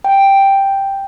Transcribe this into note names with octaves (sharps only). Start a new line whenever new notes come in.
G5